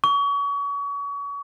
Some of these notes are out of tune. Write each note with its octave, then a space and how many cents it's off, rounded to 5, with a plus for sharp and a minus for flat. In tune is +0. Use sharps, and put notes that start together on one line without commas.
C#6 +35